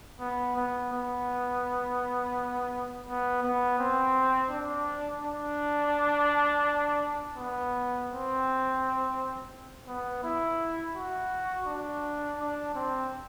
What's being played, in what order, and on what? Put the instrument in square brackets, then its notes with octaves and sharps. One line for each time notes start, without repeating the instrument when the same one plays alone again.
[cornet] B3
B3
B3
B3
B3
C4
D4
D4
B3
C4
B3
E4
F#4
D4
D4
C4